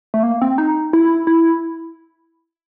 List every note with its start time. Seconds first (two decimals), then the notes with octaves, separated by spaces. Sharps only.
0.14 A3
0.23 A#3
0.42 C4
0.58 D#4
0.93 E4
1.27 E4